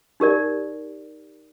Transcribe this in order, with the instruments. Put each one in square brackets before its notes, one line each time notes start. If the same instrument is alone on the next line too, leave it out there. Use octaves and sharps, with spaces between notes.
[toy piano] D#4 G4 A#4 D5